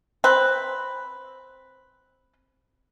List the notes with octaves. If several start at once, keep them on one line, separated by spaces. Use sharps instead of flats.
C4 B4